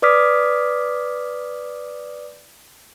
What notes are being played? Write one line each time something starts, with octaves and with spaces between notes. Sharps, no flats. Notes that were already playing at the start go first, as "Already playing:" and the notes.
B4 D5 D6 D#6 F6 B6